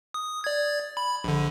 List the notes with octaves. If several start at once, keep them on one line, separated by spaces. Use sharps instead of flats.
D#6
D5 G#6
B5
A#1 D3